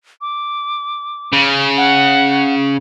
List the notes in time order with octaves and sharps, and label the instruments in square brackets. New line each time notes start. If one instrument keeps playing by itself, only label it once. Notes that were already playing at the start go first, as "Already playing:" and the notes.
[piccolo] D6
[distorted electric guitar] C#3
[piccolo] F#5